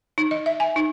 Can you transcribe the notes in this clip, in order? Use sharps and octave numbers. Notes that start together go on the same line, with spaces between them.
D#4
D#5
E5
G#5
D#4